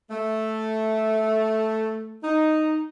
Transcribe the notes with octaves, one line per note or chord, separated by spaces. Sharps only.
A3
D#4